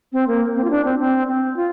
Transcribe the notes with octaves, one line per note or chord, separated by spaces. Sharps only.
C4
A#3
C4
F4
D4
C4
C4
C4
F4